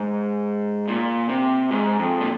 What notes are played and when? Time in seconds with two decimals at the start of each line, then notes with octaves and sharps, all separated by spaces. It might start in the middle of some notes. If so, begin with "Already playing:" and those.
Already playing: G#2
0.88 A#2
1.29 C3
1.71 G#2
1.99 F2
2.21 A#2